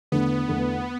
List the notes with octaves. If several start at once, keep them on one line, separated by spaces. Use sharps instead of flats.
E2 D3 A3 B3 D4
E2 D3 A3 D4